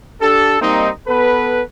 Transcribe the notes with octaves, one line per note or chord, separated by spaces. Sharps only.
D4 G4 A4
G3 A#3 C4 D#4
B3 A4 B4